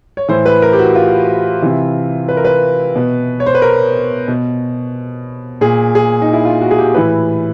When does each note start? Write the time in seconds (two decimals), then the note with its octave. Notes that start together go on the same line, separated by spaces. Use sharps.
0.17 C#5
0.29 A2 E3 C5
0.46 B4
0.62 A#4
0.73 G4
0.79 F#4
0.95 F4
1.62 C3 E3
2.29 B4
2.37 A#4
2.45 B4
2.96 B2
3.40 C#5
3.46 C5
3.55 B4
3.62 A#4
4.28 B2
5.61 A#2 G#4
5.95 G#4
6.22 D#4
6.33 E4
6.45 F4
6.61 F#4
6.71 G#4
6.78 G4
6.94 A2 E3 B4